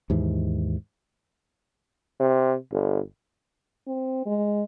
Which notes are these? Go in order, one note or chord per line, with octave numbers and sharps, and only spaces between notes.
D#2 G#2 E3
C3
G1
C4
G#3